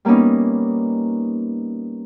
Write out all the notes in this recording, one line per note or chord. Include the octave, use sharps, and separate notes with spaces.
G3 A#3 B3 C#4 D#4